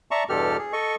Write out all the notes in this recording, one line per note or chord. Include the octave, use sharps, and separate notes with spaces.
D5 E5 A5 A#5 C#6
E2 G2 B2 G4 A4 F6
G#4
A4 D#5 C#6